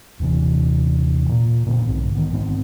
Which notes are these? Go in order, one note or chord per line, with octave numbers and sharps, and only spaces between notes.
D#1 D#2 C3 E3
A#2
A#2 D3 C4
B1 G#2 D3
D#3 B3
G#2 D#3 B3 C4